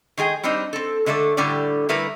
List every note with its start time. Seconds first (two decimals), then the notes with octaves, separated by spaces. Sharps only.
0.17 D#3 G#3 G#4 G5
0.43 G3 C4 D4 D#4
0.73 C4 A4
1.06 D3 G#3 A3 A4 D5
1.37 A2 D3 G3 G4 D5
1.89 D3 G3 A3 E4 A#4 B4